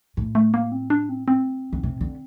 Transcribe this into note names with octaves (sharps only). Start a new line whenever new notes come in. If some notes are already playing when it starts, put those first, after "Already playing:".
A2
A3
A#3
C4
D4
C4
C4
D3
C3
D3